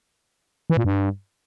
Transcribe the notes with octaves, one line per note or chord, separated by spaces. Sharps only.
E3
A#2
G2